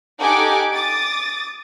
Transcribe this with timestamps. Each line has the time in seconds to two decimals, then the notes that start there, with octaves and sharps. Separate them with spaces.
0.20 D#4 G4 A4 F#5 G#5 D6
0.72 D6 D#6 A6